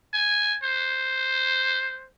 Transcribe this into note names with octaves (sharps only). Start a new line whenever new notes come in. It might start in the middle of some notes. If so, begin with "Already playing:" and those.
G#5
C5